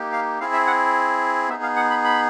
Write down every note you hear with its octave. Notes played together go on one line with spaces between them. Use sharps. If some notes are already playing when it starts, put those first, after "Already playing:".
Already playing: A#3 D#4 G4
F5
C4 E4 G#4 F5
E5
F#5
B3 D#4 G#4 E5
F5
F#5
B5
B5